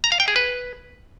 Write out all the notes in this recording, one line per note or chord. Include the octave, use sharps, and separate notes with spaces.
A#5
F5
G5
G#4
B4